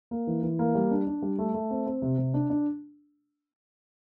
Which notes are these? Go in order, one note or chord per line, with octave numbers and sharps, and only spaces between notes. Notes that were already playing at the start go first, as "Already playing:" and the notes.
A#3
E3
E3
A#3
G3
D4
D4
G3
A3
A3
C4
C4
C3
C3
D4
D4